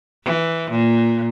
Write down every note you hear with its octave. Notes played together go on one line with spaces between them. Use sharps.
E3
A#2